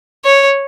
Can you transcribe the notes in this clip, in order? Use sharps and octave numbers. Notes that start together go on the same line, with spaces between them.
C#5